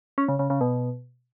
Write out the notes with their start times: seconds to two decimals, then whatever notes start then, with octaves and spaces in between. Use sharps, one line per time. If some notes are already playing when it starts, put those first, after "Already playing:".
0.18 C#4
0.29 C#3
0.39 C#3
0.50 C#3
0.61 B2